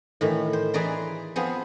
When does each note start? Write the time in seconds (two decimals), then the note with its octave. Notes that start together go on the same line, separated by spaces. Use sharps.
0.21 A2 D#3 E3
0.53 C5
0.74 E3 G#4 B4 D5 A#5 C6
1.36 F3 B3 C4 G#4